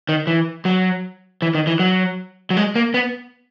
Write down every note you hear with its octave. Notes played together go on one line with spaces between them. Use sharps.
D#3
E3
F#3
E3
D#3
E3
F#3
F#3
G#3
A#3
B3